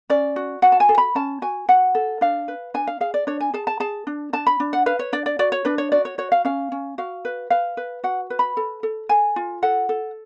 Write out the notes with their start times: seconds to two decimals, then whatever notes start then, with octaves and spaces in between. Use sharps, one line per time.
0.10 C#4 D5
0.36 F#4
0.62 F#4 F#5
0.72 A5
0.80 G#5
0.89 A4
0.98 B5
1.15 C#4 A5
1.42 F#4 G#5
1.69 F#4 F#5
1.95 A4
2.21 D4 F5
2.48 B4
2.74 D4 G#5
2.87 F5
3.00 G#4 F5
3.14 D5
3.27 D4 C#5
3.40 G#5
3.54 G#4 A5
3.67 A5
3.80 G#4 A5
4.07 D4
4.33 D4 A5
4.47 B5
4.60 D4
4.73 F#5
4.86 B4 F5
4.99 C#5
5.13 D4 D5
5.26 D5
5.39 F#4 D5
5.52 C#5
5.65 D4 B4
5.78 C#5
5.92 F#4 D5
6.05 C#5
6.18 F#4 C#5
6.32 F5
6.45 C#4 F5
6.72 C#4
6.98 F#4 F5
7.25 B4
7.50 B4 F5
7.77 B4
8.04 F#4 F#5
8.30 B4
8.39 B5
8.57 A4
8.83 A4
9.09 A4 G#5
9.36 F4
9.62 A4 F#5
9.89 A4